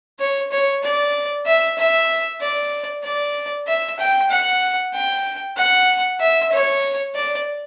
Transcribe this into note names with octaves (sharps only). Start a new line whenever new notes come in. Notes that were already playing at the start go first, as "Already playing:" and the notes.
C#5
C#5
D5
E5
E5
D5
D5
E5
G5
F#5
G5
F#5
E5
C#5
D5